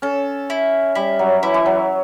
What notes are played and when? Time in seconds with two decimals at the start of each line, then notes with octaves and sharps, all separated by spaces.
0.02 C#4 A4
0.50 E4
0.95 G3 E4
1.19 F#3
1.43 E3 E4
1.54 E3
1.66 F#3